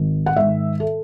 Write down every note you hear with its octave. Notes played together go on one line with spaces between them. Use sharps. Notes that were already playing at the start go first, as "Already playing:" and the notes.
Already playing: G#1
F#5
G#2 D#3 E5
A4